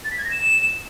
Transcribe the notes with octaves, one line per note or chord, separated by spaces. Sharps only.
A6
B6
G#6
A#6
E7